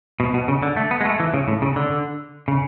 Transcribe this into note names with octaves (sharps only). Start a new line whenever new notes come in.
B2
B2
C#3
D3
A3
B3
G#3
A3
E3
C#3
A2
C#3
D3
C#3